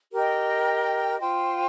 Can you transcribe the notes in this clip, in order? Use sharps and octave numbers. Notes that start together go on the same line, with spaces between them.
G4 A#4 D#5 G5
F4 C5 G5